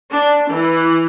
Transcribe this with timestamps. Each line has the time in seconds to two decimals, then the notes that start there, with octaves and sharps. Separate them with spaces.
0.13 D4
0.52 E3